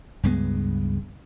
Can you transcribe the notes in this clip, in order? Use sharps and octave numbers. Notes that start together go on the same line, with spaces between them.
C#2 G2 G#3 B3